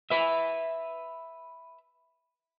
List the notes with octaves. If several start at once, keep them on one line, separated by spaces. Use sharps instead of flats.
B4 E5